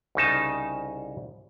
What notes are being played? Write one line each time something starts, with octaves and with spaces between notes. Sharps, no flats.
C2 C#3 D#4 A5